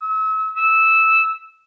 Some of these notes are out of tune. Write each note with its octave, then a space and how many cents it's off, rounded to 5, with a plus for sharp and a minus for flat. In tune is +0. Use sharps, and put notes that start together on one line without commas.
E6 -35
E6 -10